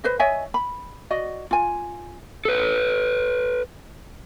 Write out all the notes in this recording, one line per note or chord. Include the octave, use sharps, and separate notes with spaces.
B4 C5 D#5
C#5 D#5 E5 G#5
B5
F#4 D5 D#5
F4 G#5
A4 B4